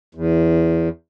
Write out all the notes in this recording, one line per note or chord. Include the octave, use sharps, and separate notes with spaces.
E2